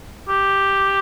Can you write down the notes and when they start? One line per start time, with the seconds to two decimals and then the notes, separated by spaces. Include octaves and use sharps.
0.29 G4